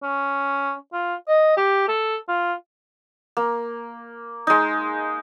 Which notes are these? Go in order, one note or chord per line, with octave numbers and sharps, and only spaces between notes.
C#4
F4
D#5
G4
A4
F4
A#3
G#3 D#4